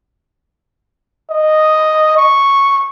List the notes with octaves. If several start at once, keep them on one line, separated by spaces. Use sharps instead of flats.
D#5
C#6